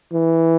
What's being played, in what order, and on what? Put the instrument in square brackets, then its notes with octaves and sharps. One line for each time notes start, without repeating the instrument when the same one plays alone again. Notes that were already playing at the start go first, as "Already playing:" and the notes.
[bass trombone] E3